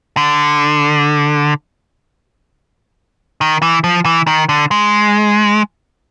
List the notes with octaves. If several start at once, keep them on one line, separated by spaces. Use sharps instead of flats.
D3
D#3
E3
F3
E3
D#3
D3
G#3